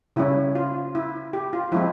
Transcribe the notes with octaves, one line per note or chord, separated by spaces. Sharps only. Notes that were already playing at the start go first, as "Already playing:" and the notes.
C#3 G3 C#4 E4
F4
E4
G4
F4
F3 G#3 C4 E4